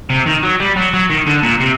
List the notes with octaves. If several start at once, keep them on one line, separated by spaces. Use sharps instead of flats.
C3
D#3
F#3
G3
F#3
F#3
D#3
D3
A#2
C3